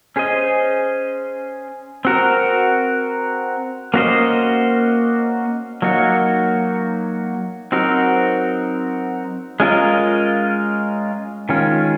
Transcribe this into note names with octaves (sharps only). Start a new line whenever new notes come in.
C#4 G#4 C5 D#5
C4 F#4 A#4
A#3 C#4 F#4 C5 D#5
F#3 A#3 D#4 F#4 C#5
F#3 C4 D#4 F#4 A#4
G#3 C#4 F4 A#4 D#5
D#3 G#3 C#4 F4